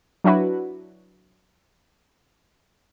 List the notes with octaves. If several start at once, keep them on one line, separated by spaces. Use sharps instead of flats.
F#3 D4 E4 F#4 B4